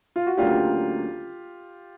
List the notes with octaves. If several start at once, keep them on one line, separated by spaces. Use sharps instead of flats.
F4
F#4
D2 C#3 F#3 A#3 D4 F4 G4